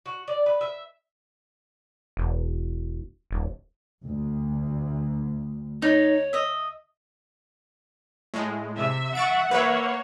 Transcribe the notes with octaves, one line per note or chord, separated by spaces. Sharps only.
F#4
D5
B4
E5
E1
D#1
D2
D#4 C#5
D#5 E5
A2 G#3
C3 E5
F#5 C#6 A6 D7
A#3 B4 C#5 E5